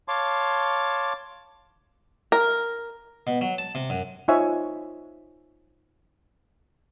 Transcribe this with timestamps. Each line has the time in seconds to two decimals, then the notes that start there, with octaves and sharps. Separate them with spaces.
0.08 C#5 F5 A5 C6 D6
2.32 A#4
3.27 B2
3.41 F#3
3.58 A5
3.75 C3
3.90 F#2
4.28 D#4 F4 C5 C#5 E5 G#5